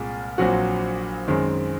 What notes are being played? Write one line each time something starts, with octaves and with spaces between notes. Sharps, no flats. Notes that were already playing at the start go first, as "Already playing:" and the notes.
Already playing: C2 A#2 G#3
A#1 A#2 F#3 C4 F#4
F#2 D#3 G#3 C4